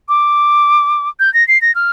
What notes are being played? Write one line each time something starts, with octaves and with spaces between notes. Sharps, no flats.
D6
G6
A#6
C7
A#6
F6